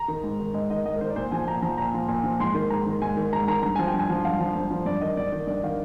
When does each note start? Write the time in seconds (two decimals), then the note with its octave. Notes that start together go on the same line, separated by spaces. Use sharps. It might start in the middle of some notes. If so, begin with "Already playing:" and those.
Already playing: A#5
0.08 D#3
0.24 G#2
0.40 D#3
0.54 G#2 D#5
0.70 D#3 D#5
0.85 G#2 D#5
0.96 A#4
1.01 D#3 C5
1.10 D5
1.16 A#2 C5
1.32 F3 G#5
1.47 A#2 A#5
1.62 F3 A#5
1.78 A#2 A#5
1.94 F3
2.08 A#2
2.24 F3
2.40 G#2 C6
2.55 D#3
2.70 G#2 A#5
2.87 D#3
3.02 G#2 G#5
3.17 D#3
3.33 G#2 A#5
3.48 D#3 A#5
3.63 G2 A#5
3.76 F3 G#5
3.87 G5
3.94 G2
3.99 G#5
4.10 F3
4.25 G2 F5
4.40 F3
4.56 G2 C5
4.71 F3
4.86 G2 D5
5.01 D#3 D#5
5.17 G2 D5
5.32 D#3
5.47 G2 D5
5.64 D#3 F5